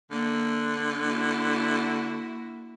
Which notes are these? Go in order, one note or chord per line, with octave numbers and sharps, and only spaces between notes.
D3 A#3
A#3 E4 F#4